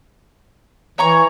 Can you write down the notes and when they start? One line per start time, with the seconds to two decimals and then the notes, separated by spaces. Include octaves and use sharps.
0.98 E3 C#5 A#5 C#6